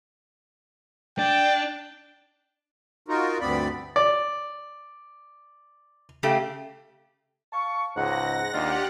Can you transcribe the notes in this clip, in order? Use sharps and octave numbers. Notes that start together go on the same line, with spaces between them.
D4 G5
D#4 F4 F#4 A#4
D2 G2 B3 C4 D5 B5
D5
C#3 A3 G4
F5 A5 C#6
C#2 G#2 F#5 A#6
D#2 D4 D#4 F4 G4 F#5